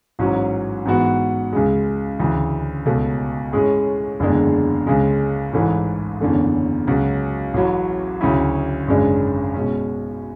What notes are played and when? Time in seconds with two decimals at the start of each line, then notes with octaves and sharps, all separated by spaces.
0.19 A1 G#2 F#3 C#4
0.85 G#2 E3 B3 F#4
1.53 C#2 C#3 G#3
2.20 D2 C#3 E3
2.86 C#2 B2 A3
3.53 A2 G#3 C#4 G#4
4.20 F#1 E2 D3 G#3 D4
4.87 C#2 C#3 G#3
5.53 A1 G#2 E3 A3
6.20 F#1 E2 D3 A3 C#4
6.87 C#2 C#3 F#3 C#4 F#4
7.54 A1 A2 F#3
8.21 D2 C#3 F#3 C#4 E4
8.88 G#1 F#2 C#3 G#3 D4
9.54 B2 G#3 C#4